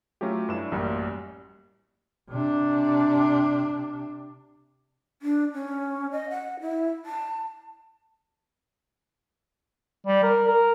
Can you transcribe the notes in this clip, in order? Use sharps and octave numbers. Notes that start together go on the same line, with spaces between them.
F#3 A3 C#4 F4 G4
G2 D4 E4 E7
A1 F#2 G3 A#3
C3 D4
D4
C#4
D#5
F#5
E4
A5
G3
A#4
A#4